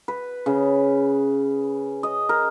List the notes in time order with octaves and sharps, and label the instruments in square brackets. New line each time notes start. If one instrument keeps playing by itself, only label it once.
[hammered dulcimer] B4
C#3
D#5
A#4